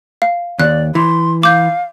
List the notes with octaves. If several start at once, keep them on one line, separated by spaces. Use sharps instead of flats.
F5
D#2 D5 F#6
E3 C6
F5 D6 G6